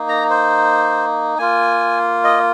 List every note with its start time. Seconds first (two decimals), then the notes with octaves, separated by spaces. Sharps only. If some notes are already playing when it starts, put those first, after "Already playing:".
Already playing: A#3 D#4
0.09 A#5
0.30 C5
1.38 A#3 F4 G#5
2.24 D#5